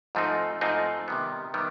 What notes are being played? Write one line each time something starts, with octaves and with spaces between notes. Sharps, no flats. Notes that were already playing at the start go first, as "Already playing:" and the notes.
G#2 F3 A3 C4 D#4
G#2 F3 A3 C4 D#4
C3 D#3 G3 B3
C3 D#3 G3 B3